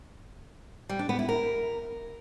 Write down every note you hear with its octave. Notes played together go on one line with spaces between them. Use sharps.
G3
D4
B3
E4
A#4